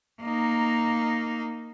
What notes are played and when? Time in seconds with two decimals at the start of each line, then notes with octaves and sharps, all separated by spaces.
0.22 A#3 D#4